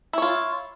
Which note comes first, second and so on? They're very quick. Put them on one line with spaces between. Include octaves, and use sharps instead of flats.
E4 C#5 F4